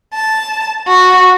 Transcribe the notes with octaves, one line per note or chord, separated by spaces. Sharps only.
A5
F#4